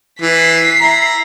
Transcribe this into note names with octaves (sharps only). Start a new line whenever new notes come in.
E3 B6 C7
E4 A#5